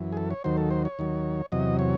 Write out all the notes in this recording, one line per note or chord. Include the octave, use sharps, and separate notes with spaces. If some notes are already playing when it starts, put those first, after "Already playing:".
Already playing: F#2 E3
G#4
A4
C#5
D#2 D#3 F#3 C5
A4
C5
C#5
D#2 D#3 F#3
E2 C3 F#3 D#5
C#5